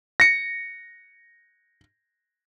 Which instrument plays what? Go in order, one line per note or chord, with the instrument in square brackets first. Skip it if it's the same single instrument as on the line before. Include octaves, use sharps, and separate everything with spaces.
[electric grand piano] A#6 C#7